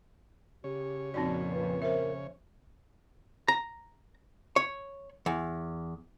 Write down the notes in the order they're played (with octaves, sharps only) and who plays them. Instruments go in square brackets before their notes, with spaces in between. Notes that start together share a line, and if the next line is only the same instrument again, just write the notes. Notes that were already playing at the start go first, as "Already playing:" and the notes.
[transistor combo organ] C#3 C#5 [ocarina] G4
[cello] F2 A#2 [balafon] C4 D#4 D5 [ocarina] F#4
[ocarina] B4
[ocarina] A#4 [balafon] C5 E5
[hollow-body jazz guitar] A#5
C#5
E2